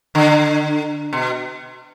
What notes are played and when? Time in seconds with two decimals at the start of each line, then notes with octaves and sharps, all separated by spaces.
0.15 D3
1.13 B2